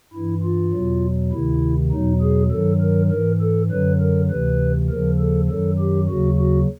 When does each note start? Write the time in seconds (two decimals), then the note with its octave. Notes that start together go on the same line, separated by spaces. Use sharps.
0.14 G2 E3 E4
0.44 F4
0.73 E2 B2 F#3
1.33 D2 C3 D#3 E4
1.92 E2 B2 F#3 D#4
2.22 G#4
2.51 G2 D#3 F#3 A4
2.81 A#4
3.11 G#2 E3 A#4
3.41 A4
3.70 F#2 D3 F#3 B4
4.01 A#4
4.30 D2 C3 E3 B4
4.90 D#2 C#3 F3 A#4
5.19 A4
5.50 F#2 D#3 F#3 A4
5.79 G4
6.09 D#2 C#3 F#3 F#4
6.39 F#4